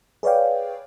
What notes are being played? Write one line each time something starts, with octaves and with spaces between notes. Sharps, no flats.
G#4 B4 C#5 D5 F5 G5